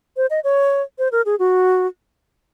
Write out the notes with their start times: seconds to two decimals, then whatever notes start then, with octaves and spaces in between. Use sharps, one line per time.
0.17 C5
0.30 D#5
0.44 C#5
0.99 C5
1.12 A#4
1.26 G#4
1.39 F#4